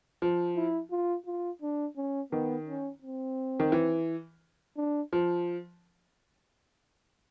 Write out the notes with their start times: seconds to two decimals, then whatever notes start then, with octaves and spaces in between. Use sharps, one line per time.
0.22 F3
0.56 E4
0.91 F4
1.26 F4
1.62 D4
1.97 C#4
2.32 D#3 B3
2.66 C#4
3.02 C4
3.60 D#3
3.72 E3
4.77 D4
5.13 F3